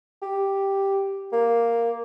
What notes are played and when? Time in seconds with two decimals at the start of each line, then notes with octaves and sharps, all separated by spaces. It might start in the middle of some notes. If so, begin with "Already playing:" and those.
0.22 G4
1.32 A#3